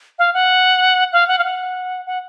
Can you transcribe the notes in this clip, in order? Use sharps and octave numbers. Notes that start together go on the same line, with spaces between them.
F5
F#5
F5
F#5
F5
F#5
F#5